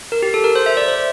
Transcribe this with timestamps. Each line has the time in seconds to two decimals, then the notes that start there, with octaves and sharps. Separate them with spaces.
0.12 A#4
0.22 G4
0.34 A4
0.44 A#4
0.55 C5
0.66 E5
0.77 D5
0.88 C5